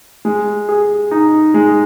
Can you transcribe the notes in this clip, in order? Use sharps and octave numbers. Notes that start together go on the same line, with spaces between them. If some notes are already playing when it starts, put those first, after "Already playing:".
G#3
G#4
D#4
G#3